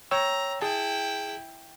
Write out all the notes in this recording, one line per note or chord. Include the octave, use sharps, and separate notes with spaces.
C#5 G5 A#5 E6
E4 G#4 G5 A5